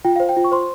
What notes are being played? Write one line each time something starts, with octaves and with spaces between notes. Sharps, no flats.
F4 G5
C5 F5
G5
F4
C#6
C5 C6